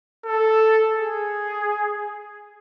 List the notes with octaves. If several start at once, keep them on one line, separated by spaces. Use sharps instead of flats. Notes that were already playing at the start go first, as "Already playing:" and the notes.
A4
G#4